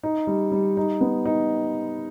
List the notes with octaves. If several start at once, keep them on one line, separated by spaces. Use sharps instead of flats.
D#4
G3
G3
D#4
B3
D#4